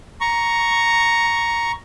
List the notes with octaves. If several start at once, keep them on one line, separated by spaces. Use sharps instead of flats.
A#5 C#6